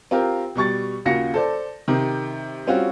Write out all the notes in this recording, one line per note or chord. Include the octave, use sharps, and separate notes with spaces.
C4 F4 G4 A#4
B2 G3 C#6 A6
D#2 C#3 F4 F#4 A#6 C#7
A4 C5 D5
C3 D#3
G3 C4 C#4 F4 F#4